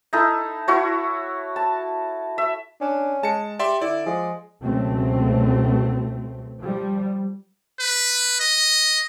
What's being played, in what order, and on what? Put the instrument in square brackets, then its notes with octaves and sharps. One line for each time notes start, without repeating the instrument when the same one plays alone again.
[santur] D#4 E4 A4
E4 F#4 C#5
A5
E5
[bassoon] C#4 [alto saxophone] D4
[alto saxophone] G#3 [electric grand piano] A5 C#7
[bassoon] G4 [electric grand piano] D5 E5 C6
[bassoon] D3 [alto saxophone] E4 [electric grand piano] D5
[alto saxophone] F3 [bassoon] G#3
[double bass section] C#2 B2 F#3 A3 C4
F3 G3
[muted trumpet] B4
D#5